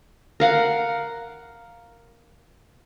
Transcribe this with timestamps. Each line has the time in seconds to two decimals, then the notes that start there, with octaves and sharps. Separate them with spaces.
0.40 A#4 F5 F#5